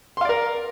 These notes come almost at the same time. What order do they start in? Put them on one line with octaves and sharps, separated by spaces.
C6 F5 D5 A#4